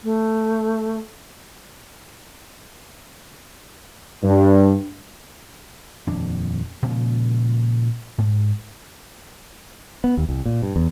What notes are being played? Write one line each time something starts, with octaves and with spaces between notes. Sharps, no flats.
A3
G2
D#1 F2 D4
A#2 C#3 F3 G#3
G#2
B3
D#2
C2
A#2
G2
E2